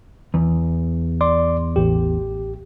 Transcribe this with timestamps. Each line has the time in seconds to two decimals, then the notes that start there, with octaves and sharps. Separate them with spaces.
0.34 E2
1.21 D5 C6 D6
1.76 A1 G4